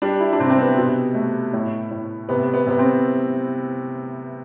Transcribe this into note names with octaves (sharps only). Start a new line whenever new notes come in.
G3 D4
E4
D4
C3 C4
C4
B3
B2
A3
A2
A2
C3 B3
B3
C3 B3
C4